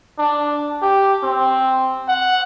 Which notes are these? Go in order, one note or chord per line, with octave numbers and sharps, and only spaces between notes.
D4
G4
C4
F#5